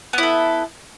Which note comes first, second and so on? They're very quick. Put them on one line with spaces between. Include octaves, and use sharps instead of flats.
B3 E4 A4